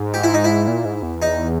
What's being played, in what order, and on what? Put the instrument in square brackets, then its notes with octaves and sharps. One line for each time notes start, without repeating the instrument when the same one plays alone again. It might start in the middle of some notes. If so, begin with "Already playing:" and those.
Already playing: [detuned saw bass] G#2
[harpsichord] G4
E4
D#4
E4
[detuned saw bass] A#2
G#2
E2
[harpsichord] D#4